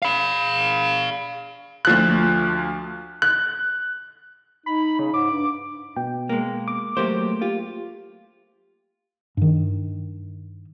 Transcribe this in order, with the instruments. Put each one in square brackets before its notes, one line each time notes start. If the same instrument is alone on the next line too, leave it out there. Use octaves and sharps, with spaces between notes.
[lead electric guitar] F5 B5
[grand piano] D2 F3 F#6
F#6
[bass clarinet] D#4 [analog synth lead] B5
[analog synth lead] C#3
[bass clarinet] G#2 [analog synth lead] D6
[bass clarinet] G2
[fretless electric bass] B2 [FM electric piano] G5
[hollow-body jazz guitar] G#3 A#3
[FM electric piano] D6
[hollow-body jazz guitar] F#3 G4 C5 [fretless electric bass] A3 A#3
[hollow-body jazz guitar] F4 [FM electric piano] G4
[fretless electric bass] G2 D#3